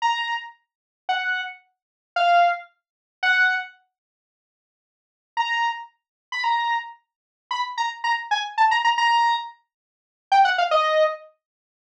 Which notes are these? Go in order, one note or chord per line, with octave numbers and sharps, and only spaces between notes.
A#5
F#5
F5
F#5
A#5
B5
A#5
B5
A#5
A#5
G#5
A5
A#5
A#5
A#5
G5
F#5
F5
D#5